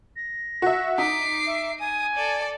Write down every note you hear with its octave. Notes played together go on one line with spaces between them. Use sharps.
A#6
F#4 E5
D#4 D6 B6 C7
E5
G#5 D#6
A4 D5